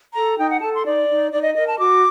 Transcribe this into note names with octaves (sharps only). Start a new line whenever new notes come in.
A4 A#5
D#4 G5
F#5
A4 A5
C6
D#4 D5
D#4
D#4 D5
D#5
A#4 D#5
A5
F#4 D6